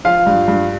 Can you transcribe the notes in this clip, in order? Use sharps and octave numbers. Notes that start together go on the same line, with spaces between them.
F3 F4 F5
G2
G2